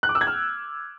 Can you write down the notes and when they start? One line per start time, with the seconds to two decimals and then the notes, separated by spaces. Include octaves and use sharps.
0.03 F#6
0.09 D6
0.15 E6
0.21 G#6
0.27 F6